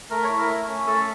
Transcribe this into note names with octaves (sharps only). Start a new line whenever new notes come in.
A3 A#4
C#5
E4
A#4
A3
C#4
A3 A4